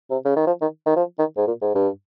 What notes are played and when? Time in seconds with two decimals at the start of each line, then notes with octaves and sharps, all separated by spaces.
0.10 C3
0.25 C#3
0.36 D#3
0.47 F3
0.61 D#3
0.86 D#3
0.96 F3
1.19 D#3
1.37 G#2
1.47 A#2
1.62 G#2
1.75 G2